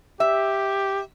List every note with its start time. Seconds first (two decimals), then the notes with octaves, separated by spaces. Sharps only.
0.20 G4 E5